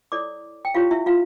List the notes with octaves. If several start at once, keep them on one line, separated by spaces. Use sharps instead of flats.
E4 A4 C#5 D5 D6
G5
E4 F4 G4 C#5 F5
E4 E5
F4 F5